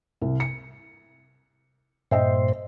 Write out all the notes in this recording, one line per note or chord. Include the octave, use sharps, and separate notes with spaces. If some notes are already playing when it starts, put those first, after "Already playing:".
C2
C#7
G2 A#2 C5 D#5 E5 G5